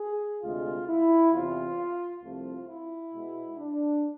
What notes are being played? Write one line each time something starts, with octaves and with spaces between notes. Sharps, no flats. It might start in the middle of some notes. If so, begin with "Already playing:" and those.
Already playing: G#4
D2 C3 G#3 F4
E4
E2 C3 E3 F4
C2 C3 F3 A3 F4
E4
B2 G#3 B3
D4